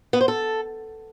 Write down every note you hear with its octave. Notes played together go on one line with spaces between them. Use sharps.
B3
C5
A4